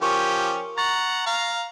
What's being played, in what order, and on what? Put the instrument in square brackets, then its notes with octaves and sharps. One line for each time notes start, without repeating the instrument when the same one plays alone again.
[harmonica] F3 C#4 G4 [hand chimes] A#4 C#6
[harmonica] F#5 A#5 [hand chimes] C#6 A6
[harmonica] F5 A#5